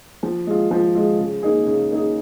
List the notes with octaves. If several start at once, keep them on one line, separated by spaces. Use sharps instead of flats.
F3
G#3 F4
F3
G#3 F4
C#3
A#3 D#4 G#4
C#3
A#3 D#4 G#4